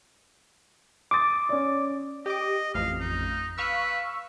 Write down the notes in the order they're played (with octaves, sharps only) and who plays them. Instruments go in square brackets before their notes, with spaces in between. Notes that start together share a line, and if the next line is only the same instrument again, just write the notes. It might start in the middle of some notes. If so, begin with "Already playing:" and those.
[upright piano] C6 D#6 A6 [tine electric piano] D6
[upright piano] C#4 D5
[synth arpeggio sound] G4 D6 [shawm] D#5
[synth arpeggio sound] A1 F2 [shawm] F5
[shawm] D#4
[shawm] B4 [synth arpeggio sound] F5 C#6 E6